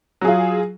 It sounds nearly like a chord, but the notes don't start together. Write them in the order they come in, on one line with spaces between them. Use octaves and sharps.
F#3 G#4 F4